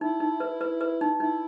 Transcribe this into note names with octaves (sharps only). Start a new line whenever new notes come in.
D#4 E4
D#4
B4
B4
B4
D#4
D#4 E4